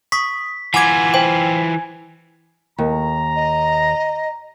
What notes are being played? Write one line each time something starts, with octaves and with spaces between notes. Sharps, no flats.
C#6 D#6 B6
E3 F4 F#5 G#5 D6 G#6
C5 G5
D#2 A#5
D#5